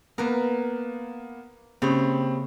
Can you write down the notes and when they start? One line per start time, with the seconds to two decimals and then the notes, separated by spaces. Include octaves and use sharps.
0.18 A#3 B3 A#4 B4
1.82 C#3 A#3 C4 G4 B5